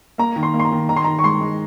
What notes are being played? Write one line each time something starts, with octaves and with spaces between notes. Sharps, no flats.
A#3 A#5
D#3
C6
A#3
C6
A#5
D#3
D#3 A#5
C6
D#3 A#5
C#6
G#3 C6
G#3